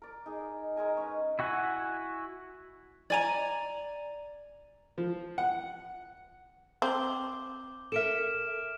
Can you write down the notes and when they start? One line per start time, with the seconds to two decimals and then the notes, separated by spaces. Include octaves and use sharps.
0.02 A#4 D5
0.26 D#4 G#4
0.76 G#3 A#4 G#5 A#5
0.97 C#4 B4
1.39 E4 F#4 F#5 G#5
3.10 D5 G#5 A#5
4.98 F3
5.38 F#5
6.82 C4 D6 G6 G7
7.92 A4 A#4 E5 F6 D7 E7